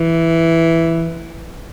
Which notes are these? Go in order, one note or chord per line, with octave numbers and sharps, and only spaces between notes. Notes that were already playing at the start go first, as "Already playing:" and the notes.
Already playing: E3